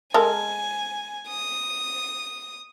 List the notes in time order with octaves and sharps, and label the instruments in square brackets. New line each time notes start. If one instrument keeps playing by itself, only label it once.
[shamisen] G#3 A4 A#4 [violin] G#5
[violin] D#6